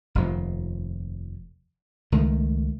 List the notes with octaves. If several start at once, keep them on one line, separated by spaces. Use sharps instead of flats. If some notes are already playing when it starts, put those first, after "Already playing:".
F1 D#2 F3
C#2 D#3 A3